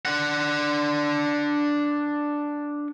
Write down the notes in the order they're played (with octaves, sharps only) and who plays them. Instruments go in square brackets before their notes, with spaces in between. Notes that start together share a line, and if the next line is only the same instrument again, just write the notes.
[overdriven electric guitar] D4 F#5